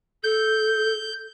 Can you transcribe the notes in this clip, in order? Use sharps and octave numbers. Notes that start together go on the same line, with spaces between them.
A4 G6